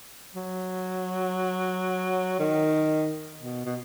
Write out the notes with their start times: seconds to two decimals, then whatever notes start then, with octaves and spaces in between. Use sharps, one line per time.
0.35 F#3
2.39 D#3
3.40 B2
3.66 B2